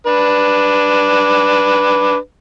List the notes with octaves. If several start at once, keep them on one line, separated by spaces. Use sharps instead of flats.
D4 B4